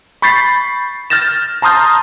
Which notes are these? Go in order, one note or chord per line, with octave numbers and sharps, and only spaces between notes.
B5 C#6 G6 A6 B6 C7
F6 G6 A6 A#6 E7
A5 A#5 C6 D#6 F6 G6